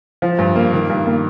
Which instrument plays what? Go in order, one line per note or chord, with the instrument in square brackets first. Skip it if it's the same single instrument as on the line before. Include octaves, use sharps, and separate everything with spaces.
[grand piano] F3
G2
A#3
D#3
G2
A#3